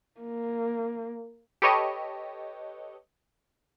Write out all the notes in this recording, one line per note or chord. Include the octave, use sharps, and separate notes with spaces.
A#3
G4 A4 B4 C#5 D#5